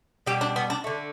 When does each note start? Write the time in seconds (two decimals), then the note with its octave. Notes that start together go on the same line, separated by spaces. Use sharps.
0.26 B2 G3 G4
0.41 D4
0.56 B3
0.70 D4
0.84 D3 A3